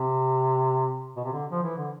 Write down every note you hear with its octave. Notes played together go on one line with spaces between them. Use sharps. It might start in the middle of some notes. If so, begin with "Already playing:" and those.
Already playing: C3
B2
C3
D3
F3
E3
D3